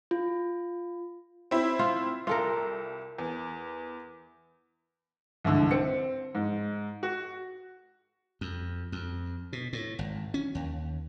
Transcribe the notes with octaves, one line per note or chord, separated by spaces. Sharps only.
F4
C4 E4
F4
C2 F4 A4 A#4
E2
C2 G#2 D3
C4 C#7
G#2
F#4
F2
F2
B2
A2
G#1
C#4
D#2